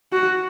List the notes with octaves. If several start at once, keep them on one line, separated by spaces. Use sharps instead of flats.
F#4